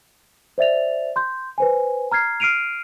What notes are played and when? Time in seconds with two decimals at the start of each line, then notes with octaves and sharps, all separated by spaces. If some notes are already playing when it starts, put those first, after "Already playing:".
0.58 C5 D5 E5 A6 F7
1.16 C6 G6
1.58 B4 C5 G#5
2.11 A#5 F6 G#6 C7
2.40 F6 C7 D7 D#7 F7